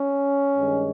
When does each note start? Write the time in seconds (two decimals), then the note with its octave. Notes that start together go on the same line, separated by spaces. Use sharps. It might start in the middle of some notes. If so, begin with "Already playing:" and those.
Already playing: C#4
0.56 G2 D#3 G#3